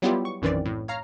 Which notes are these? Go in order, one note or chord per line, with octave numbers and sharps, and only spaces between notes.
F#3 G3 B3 E4 F4 G4
C#6
B1 F#2 D#3 E3 C4 D5
A2
C#5 F5 A#5 F6